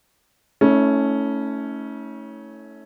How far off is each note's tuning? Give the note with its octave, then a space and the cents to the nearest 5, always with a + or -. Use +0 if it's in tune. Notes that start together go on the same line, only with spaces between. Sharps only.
A3 +0 C#4 +0 E4 -45